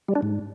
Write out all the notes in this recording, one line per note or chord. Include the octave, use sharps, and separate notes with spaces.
G3
D4
G#2